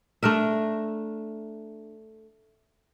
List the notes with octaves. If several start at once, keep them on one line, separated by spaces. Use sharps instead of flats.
A3 D4 A#4 E5